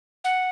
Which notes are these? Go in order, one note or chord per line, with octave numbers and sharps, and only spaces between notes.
F#5